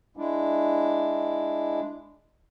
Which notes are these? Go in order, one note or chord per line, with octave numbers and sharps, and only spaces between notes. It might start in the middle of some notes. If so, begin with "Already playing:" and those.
G#3 D4 E4